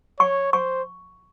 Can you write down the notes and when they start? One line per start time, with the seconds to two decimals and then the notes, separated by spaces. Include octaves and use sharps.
0.20 C#5 C#6
0.52 C5 C#6